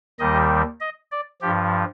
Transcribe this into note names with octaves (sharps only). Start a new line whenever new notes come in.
D#2 D#3 G3 D#5
D#5
D5
G2 F3 G4